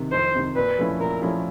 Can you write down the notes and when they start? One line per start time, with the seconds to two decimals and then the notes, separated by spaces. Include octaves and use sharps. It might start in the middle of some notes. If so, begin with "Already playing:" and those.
Already playing: C3 D#3
0.12 F2 C5
0.35 C3 D#3
0.56 A#2 B4
0.79 F3 A3 C#4 E4
1.00 A#2 A#4
1.22 F3 A3 C#4 E4